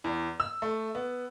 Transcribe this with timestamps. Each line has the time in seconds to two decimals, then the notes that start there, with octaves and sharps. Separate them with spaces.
0.04 E2
0.40 E6
0.62 A3
0.95 B3